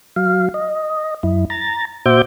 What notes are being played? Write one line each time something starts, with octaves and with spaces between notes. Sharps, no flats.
F#3 F5
D#5
F#2 E4
A#5 A6
A#2 F#4 C5 E5 D6 G6